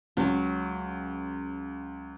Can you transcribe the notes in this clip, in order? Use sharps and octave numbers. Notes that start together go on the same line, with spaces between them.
C#2 F#3